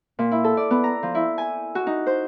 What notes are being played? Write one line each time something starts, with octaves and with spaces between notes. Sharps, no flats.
A#2
E4
A4
D5
B3
A#5
F3
E4
G#5
F#4
D#4
C5